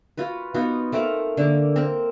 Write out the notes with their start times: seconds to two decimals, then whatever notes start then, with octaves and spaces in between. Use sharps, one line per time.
0.17 F4 F#4 B4
0.54 B3 D#4 F4 F#4
0.92 A3 C4 A#4 F5
1.37 D3 A#3
1.76 C4 A#4